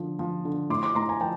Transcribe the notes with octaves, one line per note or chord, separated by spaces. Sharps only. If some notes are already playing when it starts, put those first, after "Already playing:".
Already playing: D3 F3
F3
D3
A2 C6 D6
C6 D6
A2 A#5 C6
G#5 A#5
F3 G5 A5